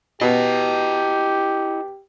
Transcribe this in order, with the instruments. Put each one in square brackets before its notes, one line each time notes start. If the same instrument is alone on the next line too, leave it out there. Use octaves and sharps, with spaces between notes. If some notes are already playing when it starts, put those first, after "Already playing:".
[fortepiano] B2 B3 [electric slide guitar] E4 D#5 [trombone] G4